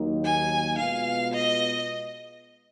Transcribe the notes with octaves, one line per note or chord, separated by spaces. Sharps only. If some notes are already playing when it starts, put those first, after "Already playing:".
Already playing: D#2 D#3 F#3 A#3 D#4
G#5
B2 G#3 B3 F4 B4 F5
D#5